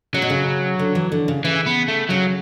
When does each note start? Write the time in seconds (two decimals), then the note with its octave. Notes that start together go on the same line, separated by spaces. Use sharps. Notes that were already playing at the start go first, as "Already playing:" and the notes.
0.14 C#3 F#3
0.22 B2
0.30 C#3
0.79 D3
0.95 E3
1.12 D3
1.28 C#3
1.45 C#3 E3
1.66 B3
1.88 A3
2.09 C#3 F#3